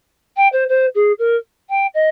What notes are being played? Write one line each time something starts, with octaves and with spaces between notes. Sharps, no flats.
G5
C5
C5
G#4
A#4
G5
D#5